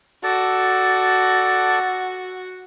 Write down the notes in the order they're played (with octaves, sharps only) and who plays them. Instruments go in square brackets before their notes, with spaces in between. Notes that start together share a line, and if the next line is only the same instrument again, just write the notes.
[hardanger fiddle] F#4 [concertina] A4 D5 A5